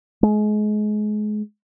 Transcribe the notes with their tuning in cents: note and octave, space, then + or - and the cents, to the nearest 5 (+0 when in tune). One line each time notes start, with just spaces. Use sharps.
G#3 +30